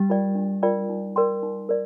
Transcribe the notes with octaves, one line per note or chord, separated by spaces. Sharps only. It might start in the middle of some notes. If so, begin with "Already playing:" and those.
Already playing: G3
F4 A#4 D5 G5
D4
F4 A#4 D5 G5
D#4
A#4 D5 G5 C6
D#4
A#4 D5